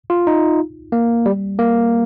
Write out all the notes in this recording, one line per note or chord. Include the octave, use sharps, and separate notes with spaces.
F4
D#4
A#3
G3
A#3